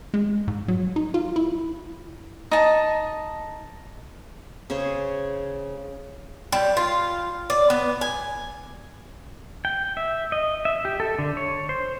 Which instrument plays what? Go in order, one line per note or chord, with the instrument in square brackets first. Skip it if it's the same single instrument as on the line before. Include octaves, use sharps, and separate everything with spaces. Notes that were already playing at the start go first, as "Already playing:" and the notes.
[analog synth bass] G#3
G#2
F#3
D#4
F4
E4
[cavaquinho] D#4 A5
[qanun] C#3 G#4 C5 C#5
[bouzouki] G3
F4
D5
B3
G#5
[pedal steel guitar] G5
E5
D#5
E5
G4
A4
D3
C#5
C5